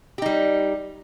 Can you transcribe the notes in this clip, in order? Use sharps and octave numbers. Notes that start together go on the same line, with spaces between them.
G3 D#4 G4